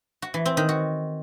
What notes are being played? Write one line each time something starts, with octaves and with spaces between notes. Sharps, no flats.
F#4
E3
C4
D#3
F#4